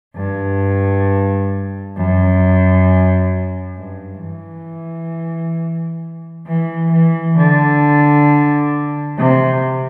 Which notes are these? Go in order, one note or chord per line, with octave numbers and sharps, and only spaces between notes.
G2
F#2
G2
E3
E3
E3
D3
C3